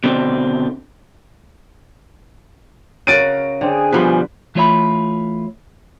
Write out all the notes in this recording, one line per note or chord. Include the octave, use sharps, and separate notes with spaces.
B2 D3 C4
C#3 F#4 A#4 A6 D7 D#7
D3 C4 G#4 G#5
B2 F3 G3 B4
E3 A3 F4 C#5 E5 B5